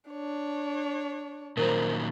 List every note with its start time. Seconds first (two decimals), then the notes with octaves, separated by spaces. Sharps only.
0.10 D4 C#5
1.57 A#2 D#3 F#3 A#4 C5